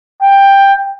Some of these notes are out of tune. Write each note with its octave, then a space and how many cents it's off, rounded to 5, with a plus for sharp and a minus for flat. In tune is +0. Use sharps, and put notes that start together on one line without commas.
G5 +10